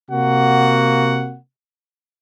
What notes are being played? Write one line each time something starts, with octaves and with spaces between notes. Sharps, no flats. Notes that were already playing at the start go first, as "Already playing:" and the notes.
C3 A#3 F#4 F#5